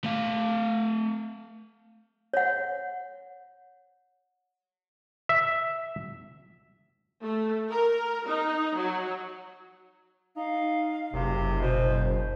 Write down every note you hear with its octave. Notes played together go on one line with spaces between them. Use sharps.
A3 F5
C#5 F#5
E5
A3
A#4
D#4
F#3
D#4 F5
F#1 C3
B2 C5